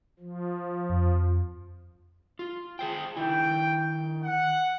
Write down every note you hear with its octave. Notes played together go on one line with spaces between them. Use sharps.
F3
F2
F4
G#4 C5 G5
D#3 E4 G5
F#5